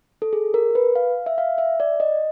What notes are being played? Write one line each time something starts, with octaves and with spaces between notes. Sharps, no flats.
A4
G#4
A#4
B4
F5
E5
F5
E5
D5
D#5